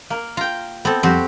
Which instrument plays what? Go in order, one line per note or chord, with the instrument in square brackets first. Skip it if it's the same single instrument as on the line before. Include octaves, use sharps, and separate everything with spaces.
[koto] A#3
[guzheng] F4 [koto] G5 A#5
[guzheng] B3 A4 [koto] C4
[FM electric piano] F2 G3 [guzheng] C4 [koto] F#4 G4